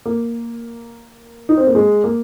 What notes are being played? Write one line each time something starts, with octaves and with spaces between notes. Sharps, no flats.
A#3
D#4
C4
A#3
G#3
A#3